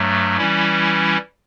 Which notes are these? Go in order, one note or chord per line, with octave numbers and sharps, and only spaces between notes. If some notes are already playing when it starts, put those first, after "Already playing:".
Already playing: G2 F#3 A3
E3 G3 C#4 E4